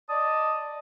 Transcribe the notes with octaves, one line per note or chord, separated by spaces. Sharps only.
D5 D#5 A5 D#6